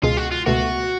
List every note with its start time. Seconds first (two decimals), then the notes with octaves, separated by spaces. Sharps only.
0.03 C#2 B2 G#3 F4
0.17 F#4
0.32 F4
0.46 C#2 B2 A3 F#4